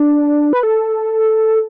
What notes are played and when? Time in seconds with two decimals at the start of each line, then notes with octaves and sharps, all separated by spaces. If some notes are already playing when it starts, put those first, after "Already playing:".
Already playing: D4
0.53 B4
0.63 A4